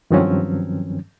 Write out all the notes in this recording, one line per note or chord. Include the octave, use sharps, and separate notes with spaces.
G2 D#3 F3 F#3 C4 C#4